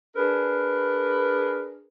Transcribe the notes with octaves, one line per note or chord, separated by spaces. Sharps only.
D4 G#4 A#4 B4